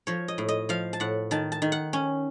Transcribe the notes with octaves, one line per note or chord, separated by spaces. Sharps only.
F3 C#5
D#5
A2
D#5
F3 F5
A5
A2 F#5
D#3 A5
A5
D#3
F#5
C#4